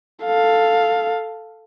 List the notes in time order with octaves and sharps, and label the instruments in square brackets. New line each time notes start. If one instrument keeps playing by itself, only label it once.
[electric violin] A4 F5